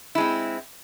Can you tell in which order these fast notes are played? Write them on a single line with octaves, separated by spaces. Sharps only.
E4 G#3 C4